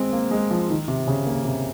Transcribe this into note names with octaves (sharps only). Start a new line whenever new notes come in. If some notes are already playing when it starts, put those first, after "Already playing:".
Already playing: G#3 C4
A#3
G#3
F3
D#3
C3
C#3
A#3
C3